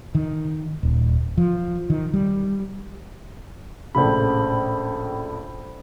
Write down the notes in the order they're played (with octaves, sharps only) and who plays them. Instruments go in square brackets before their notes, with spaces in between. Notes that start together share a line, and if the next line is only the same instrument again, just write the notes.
[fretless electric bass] D#3
D#1
F3
D#3
G3
[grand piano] A#1 A2 C#3 [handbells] C5 B5